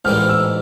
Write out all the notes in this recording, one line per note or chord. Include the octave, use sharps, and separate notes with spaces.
A1 G#2 E3 G3 A#3 F6
E6